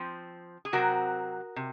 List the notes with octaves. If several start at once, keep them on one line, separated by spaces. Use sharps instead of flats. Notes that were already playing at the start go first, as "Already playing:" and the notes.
Already playing: F3 C4
G#4
C3 F#3 C4 F#4 A#4
C3